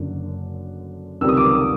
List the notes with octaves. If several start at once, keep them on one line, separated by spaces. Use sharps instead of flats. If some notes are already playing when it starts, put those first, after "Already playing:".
Already playing: F#1 F#2 D3
C#2 C3 D#3 G3 C4 E6
D#6
D6
D#6